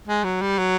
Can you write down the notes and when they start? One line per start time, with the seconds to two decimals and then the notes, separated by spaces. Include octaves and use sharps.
0.08 G#3
0.24 F#3
0.42 G3
0.58 F#3